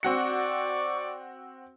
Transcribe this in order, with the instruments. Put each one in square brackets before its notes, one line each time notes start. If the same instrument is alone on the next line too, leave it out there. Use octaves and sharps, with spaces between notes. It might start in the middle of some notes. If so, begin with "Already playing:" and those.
[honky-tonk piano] C4 F#4 C#7 [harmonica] D5 C#6